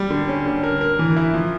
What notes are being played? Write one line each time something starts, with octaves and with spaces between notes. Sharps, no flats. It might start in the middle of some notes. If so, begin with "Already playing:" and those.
Already playing: G3
D3
C#4
D3
A#4
A#4
E3
E4
F3